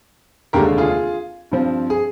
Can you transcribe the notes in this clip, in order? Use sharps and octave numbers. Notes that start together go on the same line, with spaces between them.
F1 D#2 D3 G#3 D4 G4 A#4
F4 G#4
G2 F3 C4
G#4